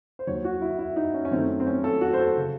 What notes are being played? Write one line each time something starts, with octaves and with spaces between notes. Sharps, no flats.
C5
D#2 D#3 F#3 C#5
F#4
E4
E4
D#4
C#4
C#4
F#2 D#3 A3 C4
C4
C#4
A4
F#4
C5
A4
C#3